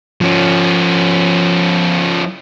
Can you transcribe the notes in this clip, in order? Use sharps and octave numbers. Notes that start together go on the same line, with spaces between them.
F3 C#4